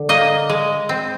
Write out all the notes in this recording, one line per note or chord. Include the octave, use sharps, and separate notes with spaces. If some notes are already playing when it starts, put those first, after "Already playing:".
Already playing: D3
A#3 D#5
G#3
C4